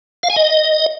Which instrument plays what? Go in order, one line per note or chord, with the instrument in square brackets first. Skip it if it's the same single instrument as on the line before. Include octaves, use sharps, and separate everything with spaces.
[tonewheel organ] F5
G#5
D#5